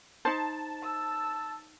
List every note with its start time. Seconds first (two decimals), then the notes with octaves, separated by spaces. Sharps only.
0.25 D#4 C5 A5
0.82 E6